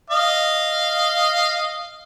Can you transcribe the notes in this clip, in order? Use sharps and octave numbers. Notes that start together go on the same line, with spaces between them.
D#5 F5